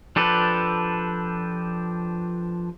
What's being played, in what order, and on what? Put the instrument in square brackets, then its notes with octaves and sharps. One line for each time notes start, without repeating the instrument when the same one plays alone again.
[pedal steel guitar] F3 D4 G4 A4 B4